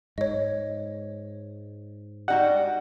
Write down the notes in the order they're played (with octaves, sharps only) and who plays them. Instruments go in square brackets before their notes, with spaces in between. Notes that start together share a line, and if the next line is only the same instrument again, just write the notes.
[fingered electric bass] G#2 [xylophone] C#5 D#5
[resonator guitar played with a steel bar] G3 D#4 F#4 [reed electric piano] F#5